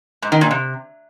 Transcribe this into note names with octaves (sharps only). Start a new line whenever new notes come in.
G#2
D#3
A#2
C3